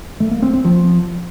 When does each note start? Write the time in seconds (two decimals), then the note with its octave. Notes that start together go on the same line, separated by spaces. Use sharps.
0.20 A3
0.31 A#3
0.42 C4
0.53 C4
0.64 F3